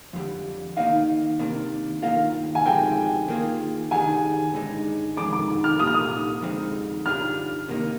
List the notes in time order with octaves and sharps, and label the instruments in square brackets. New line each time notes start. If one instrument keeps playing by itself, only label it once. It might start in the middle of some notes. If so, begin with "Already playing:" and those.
[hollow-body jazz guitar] F2 D3 G3
[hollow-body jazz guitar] D#3 A#3 D#4 [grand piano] F5
[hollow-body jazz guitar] C3 D#3 A#3 D4
[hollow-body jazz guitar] G2 D#3 A#3 F4 [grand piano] F5
[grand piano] G#5
[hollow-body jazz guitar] D2 C3 F3 G#3 [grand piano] G5
[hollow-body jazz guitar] D#3 A#3 F4 G#4
[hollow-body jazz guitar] D#3 G3 D4 G#4 [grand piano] G#5
[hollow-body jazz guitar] G2 D3 G#3 D#4
[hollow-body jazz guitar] F2 D#3 G#3 D4 G#4 [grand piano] D6
[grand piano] D6
F6
[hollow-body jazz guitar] A#2 G3 A#3 F4 [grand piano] D#6
[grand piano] F6
D#6
[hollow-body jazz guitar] F2 D3 G#3 C4 D#4
[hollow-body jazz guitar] G2 D3 G3 D4 F4 [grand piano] F6
[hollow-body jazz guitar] C3 D#3 A#3 D#4